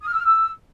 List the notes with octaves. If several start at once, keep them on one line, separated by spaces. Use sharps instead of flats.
D#6
F6
E6
F6
E6